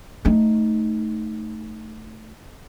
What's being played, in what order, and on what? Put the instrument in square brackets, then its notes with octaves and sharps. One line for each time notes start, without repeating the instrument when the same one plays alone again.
[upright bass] A3 D#4